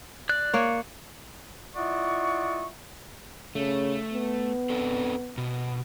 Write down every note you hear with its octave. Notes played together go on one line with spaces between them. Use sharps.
D5 F#6
A#3 C#5
E4 F4 D5 D#5 F#5 C#6
C#3 A3
B3
C4 D4 A4
B2